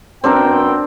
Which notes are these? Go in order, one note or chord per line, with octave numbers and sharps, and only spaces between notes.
F#2 B3 C4 D4 A#4 G5